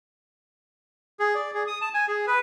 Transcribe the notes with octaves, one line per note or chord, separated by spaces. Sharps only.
G#4
D5
G#4
D#6
A5
G#5
G#4
B4